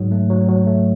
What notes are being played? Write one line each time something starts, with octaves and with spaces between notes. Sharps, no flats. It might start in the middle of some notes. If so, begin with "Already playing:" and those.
Already playing: G#2 F#3
A3
F#3
F#3
A3